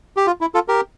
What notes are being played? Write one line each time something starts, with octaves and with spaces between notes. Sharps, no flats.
G4
F4
E4
F4 A4
G4 A#4